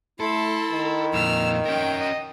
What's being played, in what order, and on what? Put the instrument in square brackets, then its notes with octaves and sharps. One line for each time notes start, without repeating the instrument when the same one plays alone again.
[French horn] A3 [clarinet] E4 [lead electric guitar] A4 [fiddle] C6
[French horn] D#3
[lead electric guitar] F2 A#2 [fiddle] E6 F6
[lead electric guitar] C#4 A#4 [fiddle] G5
[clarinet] D#5